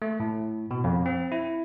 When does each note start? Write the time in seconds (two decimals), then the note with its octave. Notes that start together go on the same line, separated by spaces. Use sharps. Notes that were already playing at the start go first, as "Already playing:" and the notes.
0.02 A3
0.20 A2
0.71 B2
0.84 F2
1.06 C4
1.32 E4